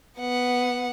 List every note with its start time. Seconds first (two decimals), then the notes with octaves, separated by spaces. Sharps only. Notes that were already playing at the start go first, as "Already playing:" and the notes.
0.19 B3 F#5